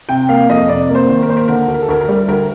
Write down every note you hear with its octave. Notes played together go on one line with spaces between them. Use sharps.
C3 G5
A#3 F5
F2 D#5
C3 D5
A#3
C5
D#3
A#4
A#3 C5
A#4
D3 A#4
D2
A#4
A4
D2 A#4
A#4
G3
D2 A#4